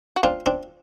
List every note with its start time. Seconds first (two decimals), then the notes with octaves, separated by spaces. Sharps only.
0.16 F#4
0.23 C4 D4 F4
0.46 C4 D4